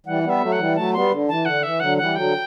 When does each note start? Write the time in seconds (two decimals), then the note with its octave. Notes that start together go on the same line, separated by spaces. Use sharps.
0.06 E3 G3 F#5
0.23 G3 B3
0.29 E5
0.41 F#3 A3
0.52 F#5
0.58 E3 G3
0.76 F#3 A3 A5
0.93 G3 B3 C6
1.11 D3
1.28 E3 A5
1.45 D3 F#5
1.63 E3 E5
1.80 D3 F#3 F#5
1.97 E3 G3 F#5
2.15 D3 F#3 G5